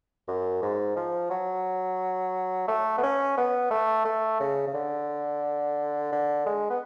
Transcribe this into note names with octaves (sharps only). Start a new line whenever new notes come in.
F#2
G#2
F3
F#3
A3
B3
C#4
B3
A3
A3
C#3
C#3
D3
D3
G#3
B3